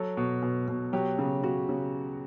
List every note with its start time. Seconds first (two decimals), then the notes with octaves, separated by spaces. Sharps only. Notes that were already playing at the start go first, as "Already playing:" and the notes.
Already playing: F#3 A4
0.17 B2
0.42 B2
0.68 B2
0.93 F#3 G4
1.18 C#3
1.43 C#3 F#4
1.69 C#3